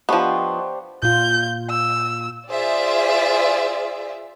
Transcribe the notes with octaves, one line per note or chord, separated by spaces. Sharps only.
F3 B3 D4 G4 C5 D#5 F#5 C#6
A#2 F4 G6
E6
F4 G#4 C5 D5 E5